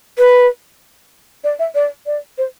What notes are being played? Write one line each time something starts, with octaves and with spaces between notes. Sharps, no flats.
B4
D5
E5
D5
D5
C5